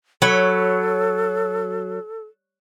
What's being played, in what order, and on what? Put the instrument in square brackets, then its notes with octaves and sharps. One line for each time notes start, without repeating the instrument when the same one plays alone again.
[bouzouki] F#3 [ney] A4 [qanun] C#5 B5